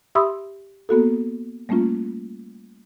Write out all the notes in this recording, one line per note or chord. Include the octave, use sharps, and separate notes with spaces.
G4 E5 B5 C6 D#6 E6
A#3 B3 F#4 A4
G3 A3 A#3 C#4 F4